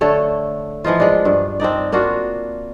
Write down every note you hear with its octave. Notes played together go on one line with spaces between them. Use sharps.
D3 A3 A4 C#5
E3 F3 D#4 F4
G#3 D4
G2
C4 D4 D#4 D5
A#3 D4 F4 F#4